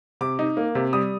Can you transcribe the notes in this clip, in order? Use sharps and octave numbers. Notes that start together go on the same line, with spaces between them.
C3 D6
D#4
A#3
C3
G3 D#6